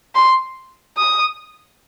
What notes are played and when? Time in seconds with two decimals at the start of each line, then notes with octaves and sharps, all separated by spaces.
0.15 C6
0.97 D#6